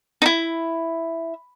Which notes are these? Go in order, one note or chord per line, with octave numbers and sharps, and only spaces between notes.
D#4 E4